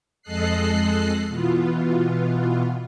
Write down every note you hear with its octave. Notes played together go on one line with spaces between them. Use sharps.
F2 G#3 A4 D#5 F#6 C7
B2 E3 B3 F4